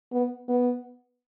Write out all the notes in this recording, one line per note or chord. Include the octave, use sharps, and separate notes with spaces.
B3
B3